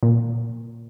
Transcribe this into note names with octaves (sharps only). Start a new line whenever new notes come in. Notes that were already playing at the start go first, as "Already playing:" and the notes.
A#2